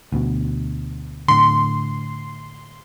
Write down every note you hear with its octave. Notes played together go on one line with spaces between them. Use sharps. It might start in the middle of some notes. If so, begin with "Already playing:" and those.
D2 B2
A2 D3 C6